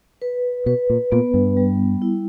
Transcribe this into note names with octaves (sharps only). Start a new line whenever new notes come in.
B4
B2 B4
A#2
A#2 B3
G2
G3
E4